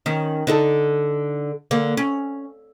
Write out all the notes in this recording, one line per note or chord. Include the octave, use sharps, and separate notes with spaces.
D#3 C#4
D3 D#4 A4
D3 A#3
C#4